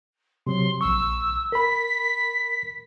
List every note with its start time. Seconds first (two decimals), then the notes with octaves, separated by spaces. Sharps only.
0.47 C3 F#3 C6
0.81 A#1 C#6 E6
1.52 A#4 B5 B6